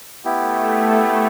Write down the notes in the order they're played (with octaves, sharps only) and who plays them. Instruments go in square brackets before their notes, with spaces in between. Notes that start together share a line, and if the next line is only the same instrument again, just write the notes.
[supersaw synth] A3 [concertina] B3 E4 G4